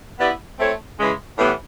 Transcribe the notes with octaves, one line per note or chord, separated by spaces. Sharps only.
B3 E4 G4 B4 D5
A3 C4 E4 A4 C#5
C#3 E3 G#3
A2 E3 G3 B3